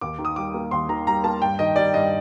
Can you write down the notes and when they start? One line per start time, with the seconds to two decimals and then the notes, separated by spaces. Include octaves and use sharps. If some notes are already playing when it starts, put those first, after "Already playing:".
0.01 D#2 D6
0.18 D#3
0.25 D#6
0.36 G3 D6
0.54 A#3
0.71 D#2 C6
0.89 D#3 A#5
1.07 G3 A#5
1.24 A#3 A5
1.41 G2 G5
1.59 D#3 D#5
1.76 G3 D5
1.94 G2 D#5